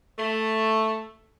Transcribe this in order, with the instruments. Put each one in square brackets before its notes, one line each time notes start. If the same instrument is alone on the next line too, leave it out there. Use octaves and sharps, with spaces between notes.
[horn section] A3